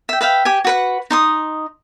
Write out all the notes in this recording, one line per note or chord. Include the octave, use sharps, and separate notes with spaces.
E5 G5
B4 E5 F5 G5
G4 G#5
F#4 B4 F#5
D#4 C6 D#6